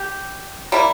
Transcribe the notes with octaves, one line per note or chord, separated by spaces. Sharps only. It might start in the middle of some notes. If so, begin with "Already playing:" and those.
Already playing: G4
G3 A#3 E4